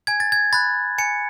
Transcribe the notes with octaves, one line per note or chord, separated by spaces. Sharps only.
G#5 G#6
A6
G#6
B5 F#6 A6
G#5 C#7